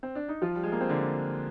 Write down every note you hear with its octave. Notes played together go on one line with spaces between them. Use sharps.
C4
D4
D#4
F3 F4
G3
G#3
A#3
C4
D3 D4